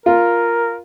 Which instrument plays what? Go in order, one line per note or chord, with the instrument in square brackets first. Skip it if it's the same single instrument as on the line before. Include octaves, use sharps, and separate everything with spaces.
[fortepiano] F4 [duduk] A#4